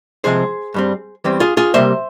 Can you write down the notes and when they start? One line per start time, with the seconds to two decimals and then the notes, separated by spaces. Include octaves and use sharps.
0.24 C3 F3 G#3 C4 G#4 C5
0.74 G2 G3 C4
1.24 E2 E3 G3 C4
1.40 F4 G#4
1.57 F4 G#4
1.74 C3 G3 A#3 C5 E5